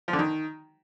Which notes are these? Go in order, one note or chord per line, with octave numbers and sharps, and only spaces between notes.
F3
D3
D#3